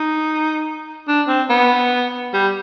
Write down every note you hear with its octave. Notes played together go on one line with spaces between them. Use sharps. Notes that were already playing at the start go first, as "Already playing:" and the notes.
Already playing: D#4
D4
C4
B3
G3